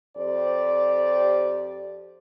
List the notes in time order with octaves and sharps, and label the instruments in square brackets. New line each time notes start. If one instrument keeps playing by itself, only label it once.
[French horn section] F2 G4 C5 D5